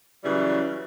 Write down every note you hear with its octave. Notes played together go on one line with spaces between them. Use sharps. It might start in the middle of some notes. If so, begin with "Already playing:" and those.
C#3 E3 F#3 G3